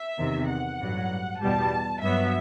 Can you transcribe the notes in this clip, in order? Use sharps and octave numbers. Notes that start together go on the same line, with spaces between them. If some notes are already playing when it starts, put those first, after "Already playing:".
Already playing: E5
E2 C3 D#3
F#5
A1 G2 F#3
E2 B2 G3 A5
G2 F#3 B3 E5